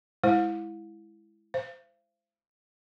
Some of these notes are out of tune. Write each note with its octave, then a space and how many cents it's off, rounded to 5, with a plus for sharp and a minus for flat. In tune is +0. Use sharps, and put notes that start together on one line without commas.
G#3 +0 E4 +0 C5 +0
C5 +0 F5 -45